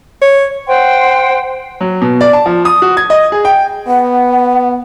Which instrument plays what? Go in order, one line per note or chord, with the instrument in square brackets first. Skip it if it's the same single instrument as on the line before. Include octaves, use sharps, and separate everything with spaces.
[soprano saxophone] C#5
[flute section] C5 F#5 G5 C6
[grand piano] F#3
B2
D5
A5
F3
D#6
F#4
G#6
D#5
G#4
G5
[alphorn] B3 [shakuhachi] F#5